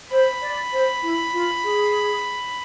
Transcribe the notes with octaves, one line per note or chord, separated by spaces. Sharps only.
C5 B5
D5
C5
E4
F4
G#4